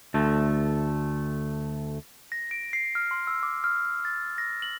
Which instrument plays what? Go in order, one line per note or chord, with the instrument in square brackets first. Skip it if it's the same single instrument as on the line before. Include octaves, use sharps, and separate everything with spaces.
[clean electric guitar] D2 A3
[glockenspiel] A#6
D7
C7
F6
C6
E6
D6
F6
A6
A#6
F#7